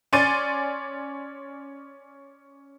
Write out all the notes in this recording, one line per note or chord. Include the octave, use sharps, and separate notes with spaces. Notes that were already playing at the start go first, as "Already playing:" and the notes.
C#4 D5 C6 A6 D#7